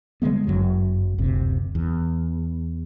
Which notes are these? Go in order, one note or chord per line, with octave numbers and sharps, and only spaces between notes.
D3 G3 G#3 B3
G1 C#2 F#2 F#3
F#1 D2 C3
E2